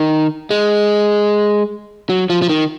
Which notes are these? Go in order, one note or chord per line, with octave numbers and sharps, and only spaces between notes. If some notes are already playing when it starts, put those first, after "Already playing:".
Already playing: D#3
G#3
F#3
F3
F3
D#3